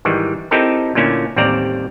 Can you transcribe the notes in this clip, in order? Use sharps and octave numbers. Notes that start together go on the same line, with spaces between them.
G#2 D#3 E3 G3
C4 D#4 E4 G4 A4 A#4
A#2 D3 A3 A#3 C#4 E4
A1 D#2 G3 C4 D5 A#5